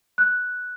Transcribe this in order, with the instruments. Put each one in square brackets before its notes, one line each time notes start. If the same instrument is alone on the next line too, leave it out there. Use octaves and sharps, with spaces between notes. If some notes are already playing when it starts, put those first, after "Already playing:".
[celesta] F#6